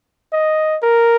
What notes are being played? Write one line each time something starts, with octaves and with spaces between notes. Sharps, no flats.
D#5
A#4